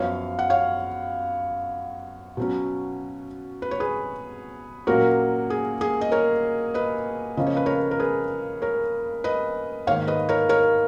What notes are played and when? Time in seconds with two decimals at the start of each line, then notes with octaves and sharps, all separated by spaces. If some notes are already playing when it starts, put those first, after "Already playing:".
Already playing: F#2 F3 B3 C#5 F5
0.39 F#5
0.50 C#5 F5
2.37 B2 F#3 C#4
3.62 B4
3.71 C#5
3.80 G#4 B4
4.87 A#2 F#3 A#3 C#4 F#4 A#4
5.50 G#4
5.81 G#4
6.01 D#5
6.12 A#4 C#5
6.74 B4 D#5
7.37 C#3 F3 A#3 C#4 D#5
7.47 C#5
7.57 B4
7.66 A#4 C#5
7.91 A#4
7.99 G#4 B4
8.62 A#4 C#5
9.24 B4 D#5
9.87 G#2 D#3 A#3 C#5 F5
10.07 B4 D#5
10.29 A#4 C#5
10.49 A#4 C#5